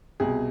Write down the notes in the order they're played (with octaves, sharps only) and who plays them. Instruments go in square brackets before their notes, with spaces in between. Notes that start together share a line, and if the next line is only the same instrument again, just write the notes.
[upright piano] C2 B2 G#4